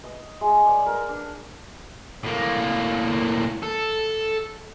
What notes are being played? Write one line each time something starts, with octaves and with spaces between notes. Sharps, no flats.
D#5
G#3
D5
A#4
D4
A2 A#3
A4